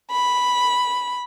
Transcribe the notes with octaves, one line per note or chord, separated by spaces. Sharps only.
B5